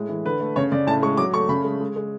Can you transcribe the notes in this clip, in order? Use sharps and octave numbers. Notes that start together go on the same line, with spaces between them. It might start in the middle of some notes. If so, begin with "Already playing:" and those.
Already playing: A2 G#3
E3
D3 B4
A3
C#3 C#5
C#3 D5
A2 A5
G#3 C#6
F#3 D6
A3 C#6
C#3 B5
G#3
G#3
G#3